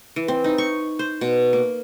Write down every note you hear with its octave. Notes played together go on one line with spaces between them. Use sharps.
E3
C4
D#4
C#6
C5
B2
A#3